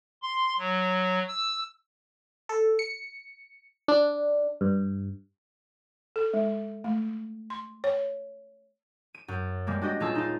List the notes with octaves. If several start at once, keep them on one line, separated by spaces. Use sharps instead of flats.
C6
F#3
E6
A4
C#7
D4
G2
A4
G#3
A3
C6
C#5
D#7
F#2
B2 G3 G#3 A#3
D4 F#4 G4 D#5
D#1 C#4 F4 G#4 A5 E6
D#4 F4